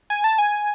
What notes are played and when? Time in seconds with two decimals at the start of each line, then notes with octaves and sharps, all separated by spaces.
0.10 G#5
0.24 A5
0.38 G#5